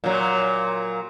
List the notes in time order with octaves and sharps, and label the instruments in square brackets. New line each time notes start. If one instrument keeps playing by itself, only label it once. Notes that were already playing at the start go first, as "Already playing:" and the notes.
[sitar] A#2 F#3